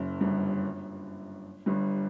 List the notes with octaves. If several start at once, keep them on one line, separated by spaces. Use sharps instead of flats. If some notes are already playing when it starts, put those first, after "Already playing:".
Already playing: F#1 F#2
G1 G2
G1 G2